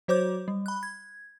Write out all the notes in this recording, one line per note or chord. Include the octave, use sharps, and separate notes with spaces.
F#3 F#4 C5 C#5 D6 G6
G3
B5 F#6
G#6